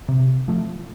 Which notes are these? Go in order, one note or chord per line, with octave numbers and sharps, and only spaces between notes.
C3
F3 A3